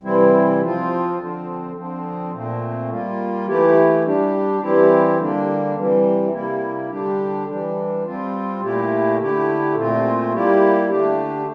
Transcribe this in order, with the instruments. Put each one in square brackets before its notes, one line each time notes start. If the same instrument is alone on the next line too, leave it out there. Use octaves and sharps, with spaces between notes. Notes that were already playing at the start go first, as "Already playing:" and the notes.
[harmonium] C3 E3 G3 C4 E4
F3 C4 F4
D3 F3 C4
D3 F3 C4
A#2 A3 C4
G3 A#3 F4
E3 A3 E4 G4
G3 D4 G4
E3 G3 C4 E4 G4
D3 G3 A#3 D4
C3 E3 G3
C3 G3 A#3 E4
D3 G3 D4 G4
E3 G3 D4
G3 C4 F4
A#2 A3 E4 G4
D3 A3 E4 G4
A#2 A3 C4 F4
G3 A#3 E4 G4
D3 A3 D4 G4